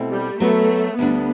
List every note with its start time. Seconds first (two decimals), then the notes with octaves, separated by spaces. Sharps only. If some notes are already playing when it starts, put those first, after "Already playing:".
Already playing: B2 A3 C4 E4
0.11 G3
0.39 F#3 A3 B3 F#4 B4
0.98 D2 D3 G3 B3 D4